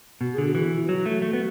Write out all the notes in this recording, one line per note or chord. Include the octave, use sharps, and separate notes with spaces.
B2 F#4
D3 G#4
F#4
E3
E4
F#3 F#4
A3
A3
B3